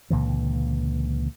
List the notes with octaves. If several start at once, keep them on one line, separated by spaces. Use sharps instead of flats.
C#2 A#2 D3 E3